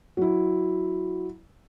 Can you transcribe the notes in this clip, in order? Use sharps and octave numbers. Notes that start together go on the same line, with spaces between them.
F#3 E4